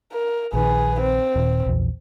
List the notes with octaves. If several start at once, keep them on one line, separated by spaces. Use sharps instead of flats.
A#4
A#1 D#3 G#4 B4
C4
D#1
A#1 E2